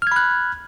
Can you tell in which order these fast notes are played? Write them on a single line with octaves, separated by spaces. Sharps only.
F6 G#6 B5 F#6